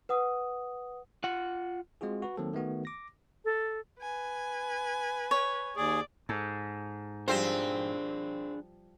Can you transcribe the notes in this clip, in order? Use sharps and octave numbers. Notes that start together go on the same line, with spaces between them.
B4 F#5 D#6
F4 F#5
G#3 C4 F4 F#4 G#4
F#4 B4
D#3 F#3 A#3 C4 A4
D#3 A3 B3 F#4
D6 A#6
A4
B4 G#5
C#5
D#2 G#4 D5
G#2 A4
F3 G3 C4 D4 G#4 C5